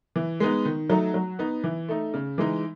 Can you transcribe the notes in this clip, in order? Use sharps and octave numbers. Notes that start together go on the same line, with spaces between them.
E3
G#3 B3 D#4
D#3
F#3 A3 D#4
F#3
B3 D#4
E3
A3 D#4
C#3
E3 G#3 D#4